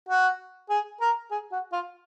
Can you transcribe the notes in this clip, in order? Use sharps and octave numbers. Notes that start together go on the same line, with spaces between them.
F#4
G#4
A#4
G#4
F#4
F4